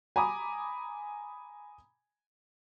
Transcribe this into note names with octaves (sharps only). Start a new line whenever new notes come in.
G#5 A#5 B5 D6 D#6